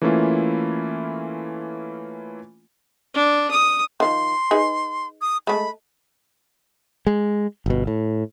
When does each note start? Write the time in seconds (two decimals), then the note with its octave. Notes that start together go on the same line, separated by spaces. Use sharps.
0.02 E3 A3 A#3 C#4 E4 F4
3.15 D4
3.51 D#6
4.00 D#3 F3 C6
4.51 D#4 G#4 B4
5.21 D#6
5.47 G#3 A3 B5
7.07 G#3
7.66 G1 B2
7.87 A2